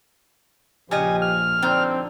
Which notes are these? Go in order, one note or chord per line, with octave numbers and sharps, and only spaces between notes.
A#1 C#3 F3 C#4 G4 D#5 G#5
F6
D3 C4 D#4 G5